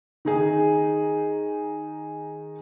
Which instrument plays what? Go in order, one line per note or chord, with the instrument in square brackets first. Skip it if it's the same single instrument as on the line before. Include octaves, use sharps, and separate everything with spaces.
[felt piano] D#3 D#4 G#4